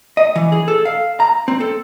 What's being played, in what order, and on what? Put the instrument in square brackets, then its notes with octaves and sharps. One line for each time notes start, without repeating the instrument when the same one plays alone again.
[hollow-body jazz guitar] D#5
E3
G#4
A4
F5
A#5
C4
A4